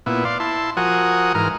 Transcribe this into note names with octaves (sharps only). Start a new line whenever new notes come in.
A#2 B3 E4
D5 F5 C6
E4 A5 C6
F3 F#4 A#4 F#5 G#5 D#6
G#2 E3 A#4 A#5 F6